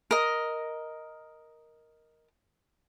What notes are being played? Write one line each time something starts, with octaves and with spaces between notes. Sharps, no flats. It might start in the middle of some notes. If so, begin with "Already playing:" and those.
A#4 D#5